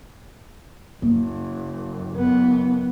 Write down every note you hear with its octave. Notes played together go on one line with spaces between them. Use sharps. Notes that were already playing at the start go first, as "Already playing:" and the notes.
F#1 A#3
F#1 B3